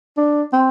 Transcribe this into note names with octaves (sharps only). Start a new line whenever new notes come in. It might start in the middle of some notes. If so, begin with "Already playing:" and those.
D4
C4